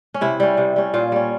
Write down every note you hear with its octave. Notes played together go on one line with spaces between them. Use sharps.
C#4
C3 E4
G3 C#4
C3
G3 C#4
A#2 F4
G3 C#4